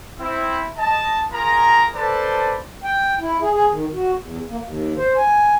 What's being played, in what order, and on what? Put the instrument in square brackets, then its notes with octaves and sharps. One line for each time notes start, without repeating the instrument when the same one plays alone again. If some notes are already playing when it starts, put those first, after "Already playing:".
[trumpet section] C4 E4
D#5 A5
F4 G#4 A#4 A#5
A4 B4 C5 D5 A5
[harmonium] G5
E4
G#4
G#4
D#3
F#4
E2
A#3
D#2
C5
G#5